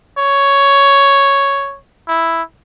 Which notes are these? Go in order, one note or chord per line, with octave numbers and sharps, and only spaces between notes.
C#5
E4